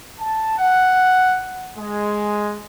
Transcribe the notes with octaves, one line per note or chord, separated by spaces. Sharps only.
A5
F#5
G#3